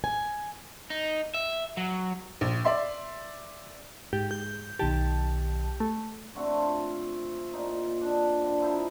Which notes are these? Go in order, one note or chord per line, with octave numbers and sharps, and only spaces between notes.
G#5
D#4
E5
F#3
A#1
D5 E5 C6
G#2 G4
G6
B1 D#3 G4 A5
A3
D3 A3 C4 F#4
C4 F4
A#2 D#4
D4
D3
F3 D#4 E4 C5